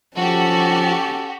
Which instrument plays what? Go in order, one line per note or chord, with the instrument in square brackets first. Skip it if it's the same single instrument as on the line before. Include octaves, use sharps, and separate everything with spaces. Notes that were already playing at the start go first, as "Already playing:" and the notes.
[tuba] F3 [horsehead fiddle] C#4 A4 [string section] F#4 G4